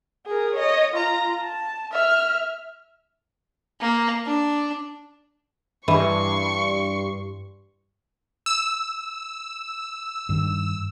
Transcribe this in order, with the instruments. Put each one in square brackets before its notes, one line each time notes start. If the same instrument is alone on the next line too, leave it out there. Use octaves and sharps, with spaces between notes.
[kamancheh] G#4 A#4
C#5 D#5
F4 A#5
A5
E5 F6
[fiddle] A#3
D4
[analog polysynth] G2 [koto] E3 [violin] C6 C#6
[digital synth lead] E6
[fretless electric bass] G2 D#3